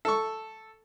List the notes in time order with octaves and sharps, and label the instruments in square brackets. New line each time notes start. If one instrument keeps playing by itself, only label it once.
[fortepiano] A4 C#6